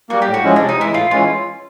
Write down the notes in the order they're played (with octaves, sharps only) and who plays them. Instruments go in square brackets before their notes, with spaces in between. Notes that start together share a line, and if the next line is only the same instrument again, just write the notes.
[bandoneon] G3 A#3 [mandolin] F#4
[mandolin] G4
[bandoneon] A2
[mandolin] F#4
[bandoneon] F3 G#3 C#4 E4
[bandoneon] C3 [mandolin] D4
[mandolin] D#4
[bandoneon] E3 G#3 [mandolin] E4
[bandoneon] A2 [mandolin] F4
[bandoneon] E3 G#3 C#4 E4 [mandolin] F4